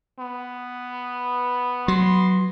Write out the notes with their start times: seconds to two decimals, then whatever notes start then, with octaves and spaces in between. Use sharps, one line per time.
0.19 B3
1.88 F#3 C6